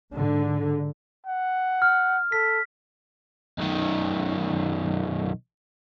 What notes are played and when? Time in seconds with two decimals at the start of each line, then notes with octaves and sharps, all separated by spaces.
0.15 G#2 D3
1.27 F#5
1.82 F6
2.32 A4 B6
3.59 B1 D#3